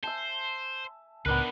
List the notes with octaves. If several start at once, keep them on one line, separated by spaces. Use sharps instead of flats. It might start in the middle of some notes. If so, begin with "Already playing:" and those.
C5 E5 G#5 A5
C#2 A2 B3 D4 D#4 A#4 B4 F#6